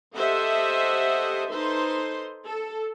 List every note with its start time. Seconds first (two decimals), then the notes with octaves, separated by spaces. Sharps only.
0.15 G4 A4 C5 D#5 E5 F#5
1.51 D#4 A4 B4 C5 C6
2.45 A4